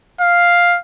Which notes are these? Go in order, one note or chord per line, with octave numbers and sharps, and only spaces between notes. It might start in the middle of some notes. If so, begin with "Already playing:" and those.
F5